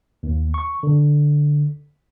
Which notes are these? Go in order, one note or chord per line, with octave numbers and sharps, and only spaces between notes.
D#2
C#6
D3